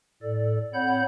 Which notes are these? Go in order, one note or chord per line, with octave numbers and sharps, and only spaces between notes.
A2 A4 D5
C4 C#5 F#5 B5 G6